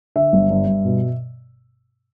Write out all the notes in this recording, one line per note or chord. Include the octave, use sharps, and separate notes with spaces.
D3 E5
G1
G2
G2
B2